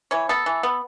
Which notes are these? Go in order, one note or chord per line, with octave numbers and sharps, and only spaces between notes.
E3 C#5
B3 A4
E3
B3